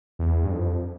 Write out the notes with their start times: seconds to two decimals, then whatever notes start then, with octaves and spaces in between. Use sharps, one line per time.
0.19 E2
0.44 G2
0.51 F2